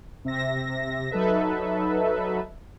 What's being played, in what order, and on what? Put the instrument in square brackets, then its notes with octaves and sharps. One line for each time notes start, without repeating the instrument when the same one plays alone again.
[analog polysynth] C3 E5 A#6
F#3 D#4 A4 B4 E5